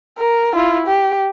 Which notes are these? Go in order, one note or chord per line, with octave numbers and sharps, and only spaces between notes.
A#4
E4 F4
G4